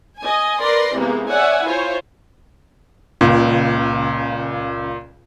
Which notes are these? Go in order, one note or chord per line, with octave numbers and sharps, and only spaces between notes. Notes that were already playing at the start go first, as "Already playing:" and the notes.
D#5 G#5
A#4 B4 D5 C6 A#6
C3 E3 G#3 A#3 B3
C#5 D5 E5 F#5 G#5
E4 F4 C5 C#5
C#2 A#2